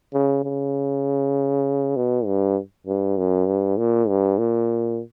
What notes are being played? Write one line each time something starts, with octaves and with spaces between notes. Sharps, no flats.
C#3
C#3
B2
G2
G2
F#2
G2
A#2
G2
A#2